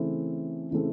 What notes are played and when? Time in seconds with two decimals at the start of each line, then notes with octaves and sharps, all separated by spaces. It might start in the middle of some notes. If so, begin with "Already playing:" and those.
Already playing: C#3 E3 A3 C4
0.71 C#3 E3 A3 C4